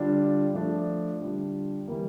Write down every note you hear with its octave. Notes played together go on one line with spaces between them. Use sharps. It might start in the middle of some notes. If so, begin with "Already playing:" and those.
Already playing: D3 G3 D4 F4
F3 A3 D4
D3 G3 D4 F4
E3 G3 A#3